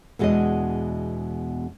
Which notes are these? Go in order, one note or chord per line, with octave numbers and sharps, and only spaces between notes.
E2 B2 G#3 A#3 D4 D#5